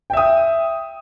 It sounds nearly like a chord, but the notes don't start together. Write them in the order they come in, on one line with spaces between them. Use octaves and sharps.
G5 E5 D#6